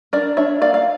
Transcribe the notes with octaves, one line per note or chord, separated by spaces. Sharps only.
D4 A#4 D5
D4 C#5 E5
A#3 D5 F5
F5